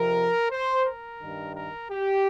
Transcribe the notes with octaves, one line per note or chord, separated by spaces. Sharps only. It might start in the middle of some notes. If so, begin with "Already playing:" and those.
Already playing: F2 C3 F3 A#4
C5
A#4
G2 D#3
A#4
G4